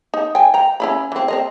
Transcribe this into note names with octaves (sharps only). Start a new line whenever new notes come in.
D#4
G5 G#5
G5 A#5
C#4 E4 B5
E3 C4
C4 A#4 D#5